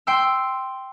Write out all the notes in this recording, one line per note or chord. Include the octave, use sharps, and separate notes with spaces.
G5 C6 E6